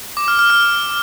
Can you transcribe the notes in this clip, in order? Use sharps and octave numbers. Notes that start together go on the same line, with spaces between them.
D6
F6
F6
F6